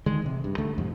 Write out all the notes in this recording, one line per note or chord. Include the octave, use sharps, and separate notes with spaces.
D3 D#3 G#3
A1 C3
G2
D2 D3 A3
A1 F2 G#2 C3